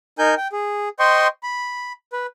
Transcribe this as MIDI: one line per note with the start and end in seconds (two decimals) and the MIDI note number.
0.19 0.35 63
0.19 0.35 70
0.19 0.35 80
0.19 0.35 91
0.37 0.48 79
0.52 0.89 68
0.99 1.28 72
0.99 1.28 75
0.99 1.28 79
0.99 1.28 84
0.99 1.28 85
1.43 1.93 83
2.13 2.26 71